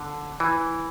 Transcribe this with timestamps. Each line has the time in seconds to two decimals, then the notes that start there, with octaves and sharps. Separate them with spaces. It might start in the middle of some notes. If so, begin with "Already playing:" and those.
Already playing: D3
0.40 E3